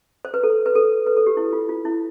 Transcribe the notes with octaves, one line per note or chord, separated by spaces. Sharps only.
C5
B4
A4
B4
A4
B4
A4
G4
E4
F4
F4
E4